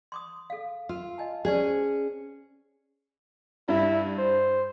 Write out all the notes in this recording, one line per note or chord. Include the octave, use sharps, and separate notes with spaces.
C6 D6 D#6
A4 F5
F4 A#4
D#5 G#5 A5
C#4 G#4 C5 D5
C5
G2 E4
C5